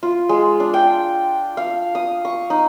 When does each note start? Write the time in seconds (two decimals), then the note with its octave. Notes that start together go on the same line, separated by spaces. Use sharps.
0.03 F4
0.29 G#3
0.60 D4
0.74 G5
1.57 F5
1.95 D#6
2.25 C#6
2.50 D#4